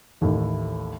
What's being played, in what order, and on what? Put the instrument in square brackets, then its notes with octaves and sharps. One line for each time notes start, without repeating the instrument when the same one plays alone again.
[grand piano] A1 D#2 A2